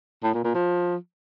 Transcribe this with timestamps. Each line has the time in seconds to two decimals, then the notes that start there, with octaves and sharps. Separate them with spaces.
0.23 A2
0.34 A#2
0.44 A#2
0.54 F3